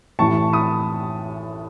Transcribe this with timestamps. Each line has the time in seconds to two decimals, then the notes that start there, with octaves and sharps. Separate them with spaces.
0.19 A1 A2 E3 A5 C#6
0.53 B5 D#6